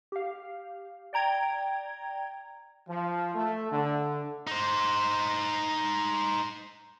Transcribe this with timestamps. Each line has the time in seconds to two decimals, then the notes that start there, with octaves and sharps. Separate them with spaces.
0.12 G4 F5
1.13 D5 G5 A#5 G#6
2.88 F3
3.34 A3
3.71 D3
4.47 D#4 C5